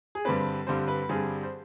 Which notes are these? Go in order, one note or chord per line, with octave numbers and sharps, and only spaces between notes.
G#4
G2 D3 G3 C4 B4
G2 D3 G3 C4 C5
B4
G2 D3 G3 C4 G#4
C5